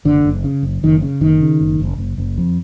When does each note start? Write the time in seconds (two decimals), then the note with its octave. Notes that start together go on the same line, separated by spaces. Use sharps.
0.05 F#1 D3
0.25 F#1
0.44 C#3
0.63 F#1
0.83 F#1 D#3
1.02 C#3
1.21 F#1 D#3
1.41 C#3
1.61 F#1
1.80 F#1
1.98 F#1
2.18 F#1
2.38 F2